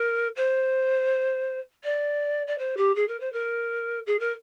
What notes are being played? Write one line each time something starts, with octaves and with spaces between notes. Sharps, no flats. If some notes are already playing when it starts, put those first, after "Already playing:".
Already playing: A#4
C5
D5
D5
C5
G4
G#4
A#4
C5
A#4
G#4
A#4